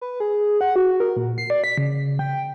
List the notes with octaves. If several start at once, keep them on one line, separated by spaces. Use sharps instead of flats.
B4
G#4
F#5
F#4
A#4
A#2
C7
D5
B6
C#3
G5